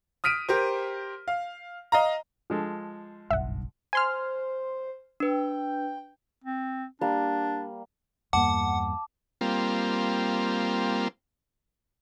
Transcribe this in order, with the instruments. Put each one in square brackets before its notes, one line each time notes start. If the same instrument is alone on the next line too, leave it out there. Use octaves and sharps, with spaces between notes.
[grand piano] D#6 F6 B6 D7 D#7
G4 A#4 C5
F5
D#5 F5 A#5
[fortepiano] F3 G#3 A4
[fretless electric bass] F#1 B1 G2 [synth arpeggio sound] E5 F#5
[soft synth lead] C5 [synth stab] G#5 C6 F6
[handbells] D4 B4 [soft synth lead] G5
[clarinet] C4
[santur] G3 A#3 [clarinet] D4
[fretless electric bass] E2 G2 A#3 [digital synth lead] F#5 [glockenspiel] A5 D6
[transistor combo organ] G3 A#3 C4 F4